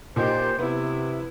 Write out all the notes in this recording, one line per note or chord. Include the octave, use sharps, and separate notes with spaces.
A#2 D#4 G4 C5
C3 B3 E4